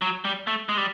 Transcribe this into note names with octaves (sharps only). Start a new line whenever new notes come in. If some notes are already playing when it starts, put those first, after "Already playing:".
F#3
G3
A3
G#3
G3